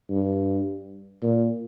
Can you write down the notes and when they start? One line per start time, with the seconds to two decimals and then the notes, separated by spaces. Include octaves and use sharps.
0.10 G2
1.23 A#2